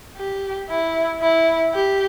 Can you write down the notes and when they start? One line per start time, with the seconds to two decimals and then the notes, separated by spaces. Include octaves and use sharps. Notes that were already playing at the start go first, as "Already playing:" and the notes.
0.17 G4
0.69 E4
1.22 E4
1.75 G4